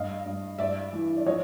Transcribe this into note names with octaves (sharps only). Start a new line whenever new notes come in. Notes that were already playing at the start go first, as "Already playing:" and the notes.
Already playing: G2 D#5 F5
G2
G2 D5 E5
E3
D5
F3 C#5 D#5